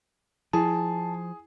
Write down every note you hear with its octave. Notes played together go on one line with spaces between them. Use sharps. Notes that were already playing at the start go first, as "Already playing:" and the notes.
F3 E4 G#4 A5